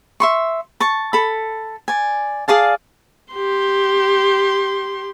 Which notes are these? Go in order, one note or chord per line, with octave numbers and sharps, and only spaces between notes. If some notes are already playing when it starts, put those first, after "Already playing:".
E5 C6 C#6
A5 C#6
A4 B5
D5 G#5
G#4 D5 F5 A5
G4 C6